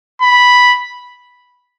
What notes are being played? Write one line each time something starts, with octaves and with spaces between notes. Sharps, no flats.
B5